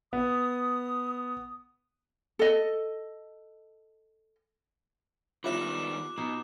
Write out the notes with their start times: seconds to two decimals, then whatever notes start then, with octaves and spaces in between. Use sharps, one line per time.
0.13 B3 D#6
2.39 A4 D#5
5.44 D#3 G3 B3 F4 E5 D6 F#6 E7
6.18 B2 D#4